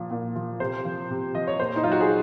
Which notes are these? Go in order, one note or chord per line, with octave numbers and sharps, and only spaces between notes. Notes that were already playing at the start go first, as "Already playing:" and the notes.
Already playing: A#2 F3
A#2
F3
C3 C5
F3
C3
F3 D#5
C#5
A#2 C5
D#4
F#3 F4
F#4
G#4